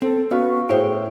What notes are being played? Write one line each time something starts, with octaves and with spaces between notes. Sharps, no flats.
C4 A4
B3 C#4 F#4 F5
A2 G#4 C5 C#5 G5